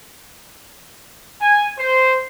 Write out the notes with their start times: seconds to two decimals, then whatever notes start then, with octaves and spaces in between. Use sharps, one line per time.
1.40 G#5
1.78 C5